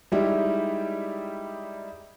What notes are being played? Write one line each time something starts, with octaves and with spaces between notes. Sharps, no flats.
G3 G#3 D#4 E4 G4